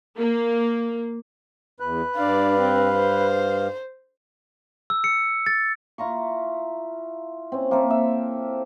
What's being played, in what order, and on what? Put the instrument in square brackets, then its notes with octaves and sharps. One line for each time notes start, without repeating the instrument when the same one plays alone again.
[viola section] A#3
[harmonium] E2 [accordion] B4 F#6
[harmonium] G2 F5 [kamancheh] D4 D5
[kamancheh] C4
C5
[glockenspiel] E6
C#7
A6
[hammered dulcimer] E4 F4 A#5 C#6
C4 C#4
A#3 C4 E4 A4
E5